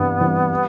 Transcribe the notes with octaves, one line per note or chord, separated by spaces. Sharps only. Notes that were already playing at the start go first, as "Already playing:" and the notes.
Already playing: G2 E3 G3 B3 C4
E3 G3 C4
G3